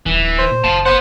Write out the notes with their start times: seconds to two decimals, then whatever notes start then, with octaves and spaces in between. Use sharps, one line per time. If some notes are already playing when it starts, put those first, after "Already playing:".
0.06 D#1 E3
0.20 D1
0.39 C5
0.51 A#2
0.64 F#1 F5 A5
0.86 B3 C5 F#5